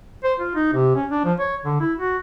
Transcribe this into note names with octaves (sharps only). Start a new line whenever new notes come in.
C5
F4
D#4
C3
C#4
D4
F3
C#5
D3
E4
F#4